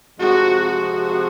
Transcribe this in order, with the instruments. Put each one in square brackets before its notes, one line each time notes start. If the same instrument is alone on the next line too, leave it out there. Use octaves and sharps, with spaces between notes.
[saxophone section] F2 C3 F3 G#3 [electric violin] F#4
[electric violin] F#4